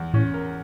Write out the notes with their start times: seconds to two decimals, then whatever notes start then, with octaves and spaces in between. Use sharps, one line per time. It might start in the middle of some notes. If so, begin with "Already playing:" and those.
Already playing: E2
0.14 A2 C#4
0.34 A#4